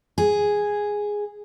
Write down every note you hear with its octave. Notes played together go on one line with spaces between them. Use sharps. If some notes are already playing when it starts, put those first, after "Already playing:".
G#4